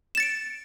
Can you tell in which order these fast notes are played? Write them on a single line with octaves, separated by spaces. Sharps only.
E7 A6 C#7 D7